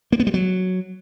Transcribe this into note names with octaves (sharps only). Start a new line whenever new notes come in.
A#3
B3
G3
F#3